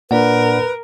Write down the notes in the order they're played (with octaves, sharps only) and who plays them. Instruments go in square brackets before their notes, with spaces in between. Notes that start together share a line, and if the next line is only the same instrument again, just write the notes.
[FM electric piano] A#2 [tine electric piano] D4 D5 F#5 [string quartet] A#4 [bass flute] B4